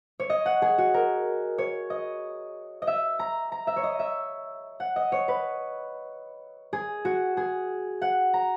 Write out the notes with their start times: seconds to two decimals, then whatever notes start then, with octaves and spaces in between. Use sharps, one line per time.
0.20 C#5
0.30 D#5
0.46 F#5
0.62 G#4
0.78 F#4
0.94 A#4
1.58 C#5
1.90 D#5
2.82 D#5
2.87 E5
3.19 A#5
3.52 A#5
3.67 E5
3.76 C#5
3.83 D#5
3.99 E5
4.80 F#5
4.96 D#5
5.12 C#5
5.28 B4
6.73 G#4
7.05 F#4
7.37 G#4
8.02 F#5
8.34 A#5